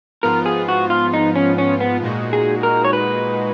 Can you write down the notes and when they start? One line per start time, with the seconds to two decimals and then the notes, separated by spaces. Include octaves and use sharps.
0.23 G#2 F3 B3 F4 A#4
0.46 G#4
0.68 F#4
0.90 F4
1.14 D#4
1.36 C#4
1.58 C#4
1.80 B3
2.03 A#2 G#3 D#4 F#4
2.33 G#4
2.63 A#4
2.84 C#5
2.93 B4